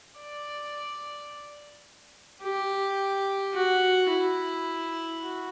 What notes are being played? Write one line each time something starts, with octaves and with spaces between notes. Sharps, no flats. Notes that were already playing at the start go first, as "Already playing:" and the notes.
D5
G4
F#4
E4
F#4